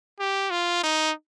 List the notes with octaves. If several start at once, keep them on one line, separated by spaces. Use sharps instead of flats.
G4
F4
D#4